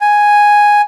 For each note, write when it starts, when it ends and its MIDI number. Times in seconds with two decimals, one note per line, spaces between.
0.01 0.82 80